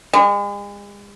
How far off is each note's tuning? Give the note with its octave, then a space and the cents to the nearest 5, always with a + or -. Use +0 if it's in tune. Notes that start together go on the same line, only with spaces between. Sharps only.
G#3 -40